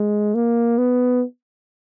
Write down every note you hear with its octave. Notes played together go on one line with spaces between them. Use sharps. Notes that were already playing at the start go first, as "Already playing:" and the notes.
Already playing: G#3
A#3
B3